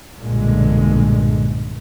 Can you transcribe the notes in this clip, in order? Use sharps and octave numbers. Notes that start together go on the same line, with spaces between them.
B1 G2 A#2 D3 G#3